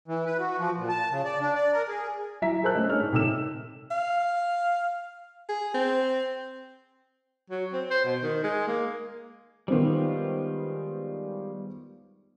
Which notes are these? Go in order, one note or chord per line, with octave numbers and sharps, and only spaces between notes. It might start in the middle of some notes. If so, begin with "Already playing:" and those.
E3
B4
F#4
F3
A#2
A5
C#3
D5
D4
D5
A#4
G#4
F#3 E4 E5 A#5 B6
G#4 A#4 C5 A5 E6 F#6
G#3 A3 C#4
G#3 D4 C#5 F6
G#2
C3 D#3 A4 E6 E7
F5
G#4
C4
F#3
C4
C5
B2
D#3
G#3
A#3
D#3 G3 G#3 B3 F4 C5